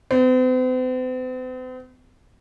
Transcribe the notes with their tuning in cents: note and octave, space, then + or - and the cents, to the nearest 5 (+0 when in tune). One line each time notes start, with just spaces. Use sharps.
C4 -45